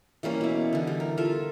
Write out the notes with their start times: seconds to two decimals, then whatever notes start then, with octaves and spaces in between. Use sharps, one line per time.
0.23 E3 G3 A#3 C#4
0.41 B2 E4
0.73 D3 E3
0.87 G3
1.00 A#4
1.18 F4 A4 A#4 E5